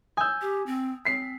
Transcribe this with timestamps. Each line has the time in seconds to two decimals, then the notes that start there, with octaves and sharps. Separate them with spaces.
0.17 G#5 D#6 E6 G6
0.41 G4
0.66 C4
1.05 C4 B6 C7